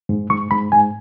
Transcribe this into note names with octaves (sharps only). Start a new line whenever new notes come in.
G#2
G#2 C#6
G#2 B5
G#2 G#5